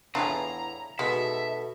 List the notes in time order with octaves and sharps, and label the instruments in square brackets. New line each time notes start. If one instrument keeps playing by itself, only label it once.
[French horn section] E2 [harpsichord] A2 [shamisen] D4 F4 G#4 [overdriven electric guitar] A#5
[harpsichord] B2 [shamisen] G#3 [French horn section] D#4 F#4 A4 [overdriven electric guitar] E5